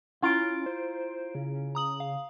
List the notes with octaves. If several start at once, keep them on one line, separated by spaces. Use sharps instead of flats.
C#4 E4 F4 A#5 D7
C5
C#3
A#5 D#6 F#7
F5